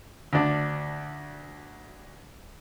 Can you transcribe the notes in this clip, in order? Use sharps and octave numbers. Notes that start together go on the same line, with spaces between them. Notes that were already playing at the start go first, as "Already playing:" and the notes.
D2 D4